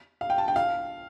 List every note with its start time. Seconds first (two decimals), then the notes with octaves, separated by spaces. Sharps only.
0.21 F5
0.30 G5
0.38 A5
0.48 G5
0.56 F5